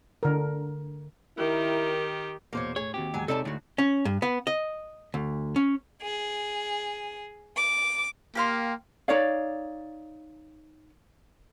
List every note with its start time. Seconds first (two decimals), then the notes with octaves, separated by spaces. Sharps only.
0.23 D3 A#4
1.38 D#3 E4 G4 A#4
2.53 E2 B2 A#3 C5 C#5
2.76 A2 G#4 C#5
2.94 D#2 C4 F#4 G4
3.14 E2 G#2 F#3 G#5
3.28 C3 G#3 D#4 A4 C#5 D5 A5
3.45 D2 A2 F#4
3.78 C#4
4.05 G2
4.22 B3
4.47 D#5
5.14 D2
5.56 C#4
6.03 G#4
7.57 D6
8.35 A#3 G4 F5 C6
9.08 D#4 C#5 D5 F5